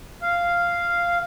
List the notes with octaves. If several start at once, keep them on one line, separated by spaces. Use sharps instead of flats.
F5